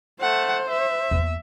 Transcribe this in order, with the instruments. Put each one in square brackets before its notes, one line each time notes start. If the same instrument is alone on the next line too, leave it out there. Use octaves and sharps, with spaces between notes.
[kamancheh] A3 F#5 [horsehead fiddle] C5
[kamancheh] E5
[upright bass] E2 A#3